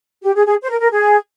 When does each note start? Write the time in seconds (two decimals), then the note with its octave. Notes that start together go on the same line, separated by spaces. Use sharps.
0.23 G4
0.35 G#4
0.46 G#4
0.63 C5
0.69 A#4
0.80 A#4
0.92 G#4